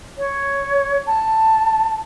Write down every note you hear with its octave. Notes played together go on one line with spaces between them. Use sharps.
C#5
A5